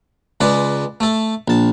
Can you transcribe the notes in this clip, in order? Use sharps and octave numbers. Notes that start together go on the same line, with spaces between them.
C#2 G#3 B4 D5
A3 A4
A#1 A5